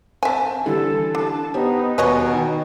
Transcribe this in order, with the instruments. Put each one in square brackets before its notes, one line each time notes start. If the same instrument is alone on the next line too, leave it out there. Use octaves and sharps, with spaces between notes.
[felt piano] C4 A5 [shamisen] E5 G#5
[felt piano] D3 E3 G3 [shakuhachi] A4
[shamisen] D4 [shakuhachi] A5
[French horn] B3 [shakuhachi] D#4 [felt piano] G4 C5
[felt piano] D#1 G#5 [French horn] B2 [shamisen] B4 C#5 D#5
[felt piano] D#3